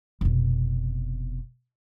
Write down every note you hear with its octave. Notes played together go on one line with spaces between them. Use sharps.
F1 B2